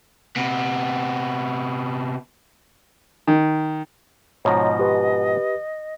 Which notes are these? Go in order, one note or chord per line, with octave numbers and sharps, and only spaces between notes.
C3 B3
D#3
G#2 B2 F3 C#5 D#5 A#5
G4 B4